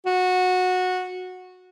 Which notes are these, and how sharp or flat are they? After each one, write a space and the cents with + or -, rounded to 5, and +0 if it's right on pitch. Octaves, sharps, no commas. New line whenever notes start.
F#4 -15